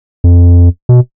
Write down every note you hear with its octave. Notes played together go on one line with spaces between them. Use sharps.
F2
B2